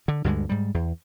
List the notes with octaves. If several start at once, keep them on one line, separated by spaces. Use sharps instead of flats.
D3
D2 G2 D3 G#3
G#2 G3
E2